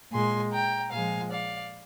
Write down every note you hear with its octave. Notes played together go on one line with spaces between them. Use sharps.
A#2 G#3 G#5 C6
G5 A#5
A#2 F3 G#3 F5 G#5
D5 F5